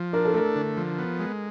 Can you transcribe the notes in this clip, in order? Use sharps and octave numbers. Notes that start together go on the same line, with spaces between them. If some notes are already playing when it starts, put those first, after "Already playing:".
Already playing: F3
D4 A#4
A4
A3 A#4
D3
F3
B3
G#3